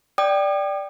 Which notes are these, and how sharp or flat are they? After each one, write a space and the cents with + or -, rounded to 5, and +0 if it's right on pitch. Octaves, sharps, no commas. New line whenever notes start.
D5 +0 G5 +0 D#6 -45